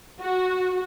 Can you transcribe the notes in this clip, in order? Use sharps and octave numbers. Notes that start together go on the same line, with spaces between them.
F#4